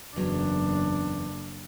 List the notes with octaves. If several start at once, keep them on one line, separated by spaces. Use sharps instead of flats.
F#1 E2 F#3 D4